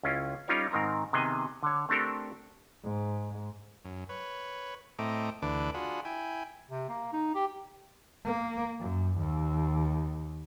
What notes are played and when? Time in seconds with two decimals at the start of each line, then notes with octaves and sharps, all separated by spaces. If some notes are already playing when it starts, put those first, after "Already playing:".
0.03 C#2 C#4 E4 F4
0.48 G3 C#4 D#4 F4 A#4 C#5
0.71 G#2 D#3 C4 A#4 A#5
1.13 C3 D#3 B3 G#4 D#5 G#5
1.63 D3 C#5
1.89 A3 C4 D4 G4 A4 A#4
2.83 G#2
3.85 F#2
4.09 B4 C#5
4.99 A2 A3 C4 D#5 A#5 D6
5.42 D2 D3 E3 D4 B4 D6
5.74 D4 F4 F#4 G#4 B5
6.05 E4 G5 G#5
6.70 C3
6.89 A#3
7.13 D#4
7.35 G4
8.25 A#3
8.80 F#2
9.19 D#2